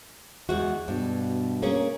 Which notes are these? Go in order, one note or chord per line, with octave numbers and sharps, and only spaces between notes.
E2 G#3 F#4
G2 B2
A#3 C#4 G#4